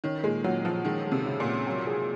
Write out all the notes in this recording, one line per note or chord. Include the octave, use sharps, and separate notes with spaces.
D#3 C#4
A#2 G#3
A#2 F#3
A#2 F3
D#3 G#3
G#3
C3
C#3
A#2
G#3
F#3
G#4